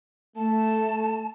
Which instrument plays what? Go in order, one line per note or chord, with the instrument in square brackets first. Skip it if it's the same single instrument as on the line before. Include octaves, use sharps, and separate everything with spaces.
[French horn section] A3 [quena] A5